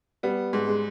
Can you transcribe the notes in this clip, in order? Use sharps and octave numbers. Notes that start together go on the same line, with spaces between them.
G3 B3
G#2
G#3